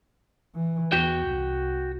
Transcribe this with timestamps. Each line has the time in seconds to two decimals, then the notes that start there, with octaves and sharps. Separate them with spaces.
0.55 E3
0.92 E2 F#4 G5
1.26 C2